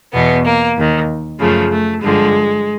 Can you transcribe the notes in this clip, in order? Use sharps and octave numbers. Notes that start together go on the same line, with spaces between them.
E2 B2 B3
A#3
D#2 D#3
F#2 C#3 F3 A3
A3
G2 D3 F3 G#3